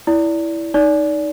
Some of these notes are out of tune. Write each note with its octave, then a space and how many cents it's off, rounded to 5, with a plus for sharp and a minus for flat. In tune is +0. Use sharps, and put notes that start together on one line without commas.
E4 +0 D5 -20
D#4 +0 D5 -25